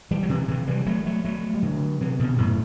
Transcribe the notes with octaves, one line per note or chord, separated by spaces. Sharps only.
E3 G3
F#3
C3 E3
C3 E3
E3 G3
F#3 A3
F#3 A3
F#3 A3
G3
D3 F#3
C3 E3
B2 D3
F#2 A2